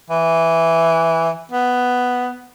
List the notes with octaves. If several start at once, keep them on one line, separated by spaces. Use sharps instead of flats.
E3
B3